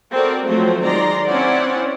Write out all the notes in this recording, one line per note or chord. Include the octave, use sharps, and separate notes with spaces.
C4 F#4 A4 A#4 D5
F3 F#3 A3 C4 F#4 C5
D#3 G#3 D5 A#5 C6
C4 C#4 E4 C5 D5 F#5